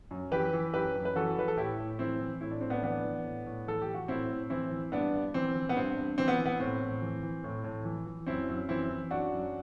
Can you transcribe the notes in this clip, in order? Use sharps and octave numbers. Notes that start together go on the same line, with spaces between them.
F#2
E3 G4 B4
E3
F#2 G4 B4
F#2
B4
E3 F#4 A4
E3 B4
A4
A2 E4 G4
A2
E3 C4 E4
E3
A2 E4
D4
A2 C4
B3 D4
E3 B3 D4
E3
A2
A2
E3 A4
G4
E3
F#4
A2 C4 E4
A2
E3 C4 E4
E3
G2 B3 D4
G2
E3 C4
E3
B3
G2 C4
G2
E3 C4
B3
E3
B3
A2 C4
A2
E3
E3
A2
A2
E3
E3
F#2 C4 E4
F#2
E3 C4 E4
E3
F#2 D4 F#4
F#2